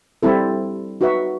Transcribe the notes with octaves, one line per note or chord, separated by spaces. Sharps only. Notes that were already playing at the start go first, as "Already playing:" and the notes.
G3 C4 E4 A4
D#4 F#4 B4 E5